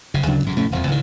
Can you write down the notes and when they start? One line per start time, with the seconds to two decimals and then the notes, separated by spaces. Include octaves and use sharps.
0.14 F#1 C#3
0.27 D2 C#3 F#3 D4
0.44 G#1 F#2 C#3
0.56 F1 A2 A3 C#4
0.72 D#1 F2 F3
0.87 C#2 A2 D#3